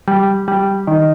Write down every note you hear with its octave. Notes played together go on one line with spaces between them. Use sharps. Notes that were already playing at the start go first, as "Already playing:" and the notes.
G3
G3
D#3